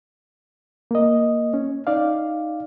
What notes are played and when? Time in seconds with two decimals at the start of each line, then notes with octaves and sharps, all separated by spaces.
0.91 A#3 D#5
1.54 C#4
1.87 D#4 D5 F5